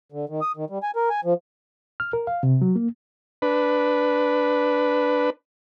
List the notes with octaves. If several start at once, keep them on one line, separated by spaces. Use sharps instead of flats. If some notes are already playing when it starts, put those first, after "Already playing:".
D3
D#3
D#6
D#3
G3
G#5
A#4
G#5
F3
F6
A#4
F5
C3
F#3
A#3
D4 B4